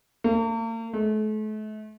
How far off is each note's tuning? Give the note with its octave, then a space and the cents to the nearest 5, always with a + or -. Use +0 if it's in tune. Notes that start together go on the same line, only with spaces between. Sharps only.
A#3 -45
A3 -40